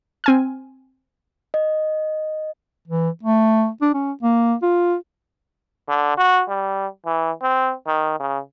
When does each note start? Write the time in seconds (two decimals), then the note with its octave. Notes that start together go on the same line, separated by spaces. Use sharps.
0.24 C4 G#5 F6
1.54 D#5
2.88 E3
3.23 A3
3.82 D4
3.94 C#4
4.23 A#3
4.62 F4
5.89 D3
6.17 F#4
6.49 G3
7.06 E3
7.42 C4
7.87 D#3
8.20 C#3